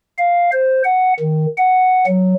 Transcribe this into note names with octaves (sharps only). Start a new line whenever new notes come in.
F5
C5
F#5
D#3
F#5
F#3